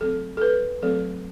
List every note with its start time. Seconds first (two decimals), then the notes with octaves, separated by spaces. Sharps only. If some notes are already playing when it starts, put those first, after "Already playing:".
0.01 F#3 A3 C4 A4
0.37 A4
0.42 B4
0.82 F#3 A3 C4 A4